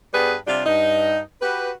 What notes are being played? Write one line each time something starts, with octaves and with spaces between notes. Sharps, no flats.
G2 G3 B3 G#4 B4
C3 G3 D4 F4
G2 D#4
F#4 G4 B4